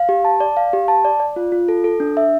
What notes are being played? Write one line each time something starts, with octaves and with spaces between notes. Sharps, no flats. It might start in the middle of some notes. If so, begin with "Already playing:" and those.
Already playing: F5
G4
A5
D5
F5
G4
A5
D5
D5
F4
F4
A4
A4
D4
E5